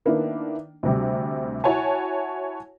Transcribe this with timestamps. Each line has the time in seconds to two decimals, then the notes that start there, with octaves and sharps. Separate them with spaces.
0.05 D#3 A#3 B3 D4 E4
0.83 D2 C3 G3
1.64 E4 F#4 C#5 F#5 G#5 A5